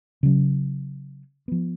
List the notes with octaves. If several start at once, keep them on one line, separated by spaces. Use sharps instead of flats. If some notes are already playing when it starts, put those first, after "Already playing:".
C#3 F#3 C#4
F3 B3